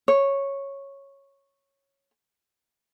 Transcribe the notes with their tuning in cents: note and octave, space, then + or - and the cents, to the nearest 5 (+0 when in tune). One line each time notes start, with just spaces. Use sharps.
C#5 -5